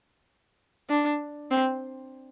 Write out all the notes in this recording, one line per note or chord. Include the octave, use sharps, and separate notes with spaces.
D4
C4